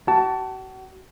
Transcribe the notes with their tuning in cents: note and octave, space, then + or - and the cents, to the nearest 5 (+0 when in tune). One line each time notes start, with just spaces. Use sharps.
F#4 +40 A5 +0